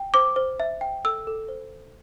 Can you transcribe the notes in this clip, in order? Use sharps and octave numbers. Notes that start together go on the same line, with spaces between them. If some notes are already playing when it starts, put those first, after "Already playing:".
Already playing: G5
C5 D6
C5
E5
G5
A4 E6
A4
C5